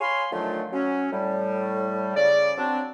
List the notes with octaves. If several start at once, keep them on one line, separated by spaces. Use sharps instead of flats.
C#5 F5 G#5 B5 C6
D3 D#3 F3 F#3 A3
F#3 C#4
A2 G3
C#3 D5
F#3 C4 D4